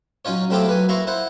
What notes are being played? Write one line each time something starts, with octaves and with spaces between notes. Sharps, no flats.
F#3 C#4 D#4 F4 C#5
F#3 A3 C4 E4 F4 G4
F#3 B4 G#5
A#3 E4 A#5 C6 C#6
E4 C5 F#5